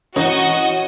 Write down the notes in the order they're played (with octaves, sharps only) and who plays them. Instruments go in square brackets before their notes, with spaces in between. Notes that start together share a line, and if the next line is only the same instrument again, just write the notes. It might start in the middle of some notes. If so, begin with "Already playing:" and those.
[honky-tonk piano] E3 C#4 [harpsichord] D#4 [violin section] F#4 D#5 C#6 [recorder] F#5